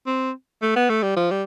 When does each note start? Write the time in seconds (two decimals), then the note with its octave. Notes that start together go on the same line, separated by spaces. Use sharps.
0.06 C4
0.62 A3
0.76 B3
0.90 A3
1.03 G3
1.16 F3
1.31 G3